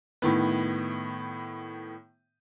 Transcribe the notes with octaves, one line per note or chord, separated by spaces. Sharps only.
A2 D#3 B3